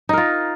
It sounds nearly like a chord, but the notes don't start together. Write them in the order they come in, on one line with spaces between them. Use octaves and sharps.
D#4 A#4 F4